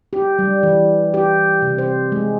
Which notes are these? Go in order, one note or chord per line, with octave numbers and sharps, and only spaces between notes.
G4
G3
E3
G4
C3
C5
G#3